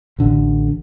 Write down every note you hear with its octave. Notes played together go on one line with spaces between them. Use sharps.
A1 D3